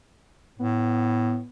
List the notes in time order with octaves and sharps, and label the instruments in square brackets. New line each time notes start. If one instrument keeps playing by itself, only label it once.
[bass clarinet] A2 [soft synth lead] B3